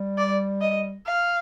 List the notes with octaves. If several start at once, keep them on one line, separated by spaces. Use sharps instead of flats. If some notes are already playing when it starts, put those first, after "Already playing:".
Already playing: G3
D5
D#5
F5